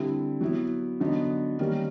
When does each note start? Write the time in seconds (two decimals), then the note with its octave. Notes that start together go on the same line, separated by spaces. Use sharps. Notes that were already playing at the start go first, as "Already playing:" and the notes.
Already playing: D3 G3 C4 E4
0.41 F#3 B3 E4
1.00 D3 F#3 B3 D#4
1.59 D#3 G3 A#3 C#4